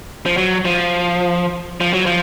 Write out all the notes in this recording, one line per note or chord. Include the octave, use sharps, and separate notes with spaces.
F3
F#3
F3
F3
F#3
F3